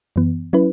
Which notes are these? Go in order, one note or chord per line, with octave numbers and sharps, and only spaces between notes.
F#2 E3 B3
F#3 C#4 E4 B4